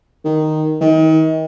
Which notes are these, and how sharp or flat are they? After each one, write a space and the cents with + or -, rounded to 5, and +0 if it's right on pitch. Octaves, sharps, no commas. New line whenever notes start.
D#3 -5
D#3 +35